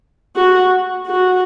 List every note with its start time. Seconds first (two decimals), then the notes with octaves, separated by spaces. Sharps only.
0.36 F#4
1.07 F#4